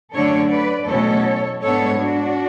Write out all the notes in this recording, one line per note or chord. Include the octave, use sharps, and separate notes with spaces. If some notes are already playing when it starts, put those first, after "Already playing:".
F#2 D3 A3 D4 A4 C#5
B4 D5
E2 B2 F#3 A3 C#4 A4 C#5
G#2 G#3 B3 D4 A4 C#5
D4 F#4